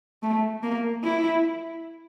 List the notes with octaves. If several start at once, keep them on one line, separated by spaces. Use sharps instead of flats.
A3
A#3
E4